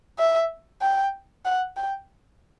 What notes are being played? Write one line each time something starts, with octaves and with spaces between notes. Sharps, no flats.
E5
G5
F#5
G5